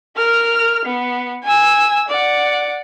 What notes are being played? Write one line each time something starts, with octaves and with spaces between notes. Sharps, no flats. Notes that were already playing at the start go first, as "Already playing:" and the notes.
A#4 F6
B3
G#5 E6
D5 F#5